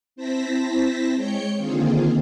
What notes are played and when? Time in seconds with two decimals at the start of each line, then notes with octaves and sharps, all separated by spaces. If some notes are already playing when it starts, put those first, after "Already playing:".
0.16 C4 E4 C5 A5 A#6 B6
1.15 G#3 C#5 G5 G6 C#7
1.57 D3 D#3 A#3 C4 F4 G#4